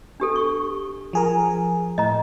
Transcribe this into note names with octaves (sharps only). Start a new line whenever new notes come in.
D4 G4 A4
C#6
F3 G#4 A#4
A2 D#5 A#5